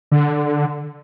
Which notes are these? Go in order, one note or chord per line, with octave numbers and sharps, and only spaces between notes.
D3